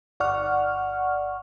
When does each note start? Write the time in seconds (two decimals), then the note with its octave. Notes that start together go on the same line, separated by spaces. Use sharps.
0.20 G1 D5 F#5 C#6 F6